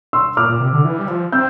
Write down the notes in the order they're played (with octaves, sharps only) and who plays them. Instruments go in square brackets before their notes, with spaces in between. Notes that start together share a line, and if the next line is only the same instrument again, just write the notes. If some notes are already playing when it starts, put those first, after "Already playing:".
[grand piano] C6 E6
[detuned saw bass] A#2 [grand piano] D6 F6
[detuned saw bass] A#2
C3
D3
E3
G3
F3
[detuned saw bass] C4 [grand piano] E6 G6